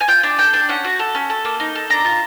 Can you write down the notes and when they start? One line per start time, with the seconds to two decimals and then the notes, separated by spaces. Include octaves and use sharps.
0.01 G#5
0.08 F4 G5
0.23 D4
0.38 A4 G5
0.54 D4
0.69 C#4 F#5
0.85 F#4
0.99 A4
1.15 C#4
1.30 A4
1.45 A#3
1.60 D#4
1.75 A4
1.90 D4 A#5
2.05 F4